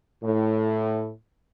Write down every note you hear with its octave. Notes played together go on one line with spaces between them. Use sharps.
A2